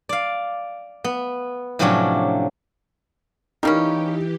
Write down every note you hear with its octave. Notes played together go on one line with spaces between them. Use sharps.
D5 F5
B3
A2 C3 F3 F#3 C#4 D4
E3 G3 A#3 C#4 D#4 G4